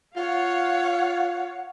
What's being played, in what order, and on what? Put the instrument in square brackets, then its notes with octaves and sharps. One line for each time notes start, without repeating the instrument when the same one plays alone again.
[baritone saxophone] F4 [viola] C#5 F5 [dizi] F#5